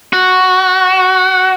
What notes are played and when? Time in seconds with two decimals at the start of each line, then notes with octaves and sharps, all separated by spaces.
0.13 F#4